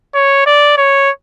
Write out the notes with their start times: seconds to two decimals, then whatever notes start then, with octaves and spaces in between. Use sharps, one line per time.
0.15 C#5
0.46 D5
0.78 C#5